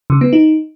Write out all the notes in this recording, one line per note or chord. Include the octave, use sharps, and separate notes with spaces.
C#3
B3
D#4